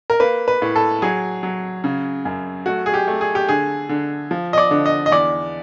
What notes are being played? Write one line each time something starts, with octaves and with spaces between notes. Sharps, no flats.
A#4
A#3 B4
B4
A2
A4
F#3 G#4
F#3
C#3
F#2
A3 F#4
G#4
G4
A3
G#4
G4
D3 G#4
D3
F3
D#5
D5
D3
D#5
D#5
E2 D5